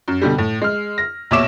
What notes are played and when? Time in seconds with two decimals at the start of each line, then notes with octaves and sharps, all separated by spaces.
0.08 F#2
0.22 B2 D3 G3
0.38 A2
0.61 G#3 F6
0.98 A#6
1.31 A#1 B2 C#5 E5 D6 E7